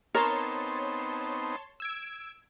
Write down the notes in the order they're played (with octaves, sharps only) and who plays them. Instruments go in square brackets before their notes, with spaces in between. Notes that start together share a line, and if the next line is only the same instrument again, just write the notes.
[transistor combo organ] B3 C4 D#4 [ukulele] A#4 [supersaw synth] C#5 A5 C6
[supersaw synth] E6 G#6 D7